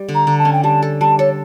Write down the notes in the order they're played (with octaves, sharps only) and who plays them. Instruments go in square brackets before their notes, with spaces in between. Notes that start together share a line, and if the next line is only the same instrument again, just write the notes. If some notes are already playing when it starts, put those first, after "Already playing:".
Already playing: [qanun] G3
D3
[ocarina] A#5
[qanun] D3
[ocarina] A5
[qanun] C#4
[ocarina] G5
[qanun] G3 [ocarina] A5
[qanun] A4
[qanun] G3 [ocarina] A5
[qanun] A4 [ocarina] C#5